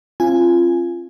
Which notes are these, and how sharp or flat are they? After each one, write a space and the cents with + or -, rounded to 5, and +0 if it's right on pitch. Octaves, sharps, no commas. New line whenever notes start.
C4 +35 F4 -20 G#5 +0